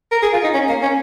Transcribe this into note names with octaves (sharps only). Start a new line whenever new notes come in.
A#4
G#4
F4
D#4
C#4
A#3
C#4